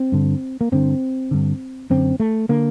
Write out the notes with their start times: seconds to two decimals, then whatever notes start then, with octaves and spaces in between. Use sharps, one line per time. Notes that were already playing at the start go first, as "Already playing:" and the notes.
Already playing: C4
0.12 G2 D3
0.61 A#3
0.72 G2 D3 C4
1.31 G2 D3
1.90 F#2 D3 C4
2.20 A3
2.49 D3 A#3